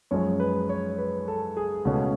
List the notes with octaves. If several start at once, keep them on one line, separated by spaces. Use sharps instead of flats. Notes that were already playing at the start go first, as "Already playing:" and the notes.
F#2 F3 G#3 C#5
B4
C#5
B4
A4
G#4
C#2 B2 A3 C#4 F#4